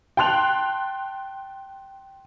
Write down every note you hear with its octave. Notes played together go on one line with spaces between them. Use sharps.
G5 A5 C6 F#6 F7